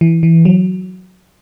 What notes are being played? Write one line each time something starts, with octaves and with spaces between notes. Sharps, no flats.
E3
E3
F#3